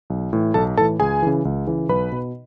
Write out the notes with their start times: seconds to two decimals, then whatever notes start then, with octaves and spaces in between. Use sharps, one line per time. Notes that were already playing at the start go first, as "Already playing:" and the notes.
0.10 B1
0.33 A2 E3
0.54 B1 A4 A5
0.77 A2 A4 A5
0.81 E3
0.99 C#2 G#4 G#5
1.22 C#3 E3
1.45 C#2
1.67 C#3 E3
1.89 B1 B4 B5
2.12 B2